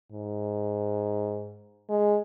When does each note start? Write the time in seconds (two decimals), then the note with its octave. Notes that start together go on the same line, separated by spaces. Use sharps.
0.12 G#2
1.89 G#3